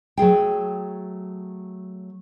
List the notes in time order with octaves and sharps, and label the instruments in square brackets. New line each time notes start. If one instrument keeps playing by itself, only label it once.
[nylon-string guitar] F#3 A3 G#4 G5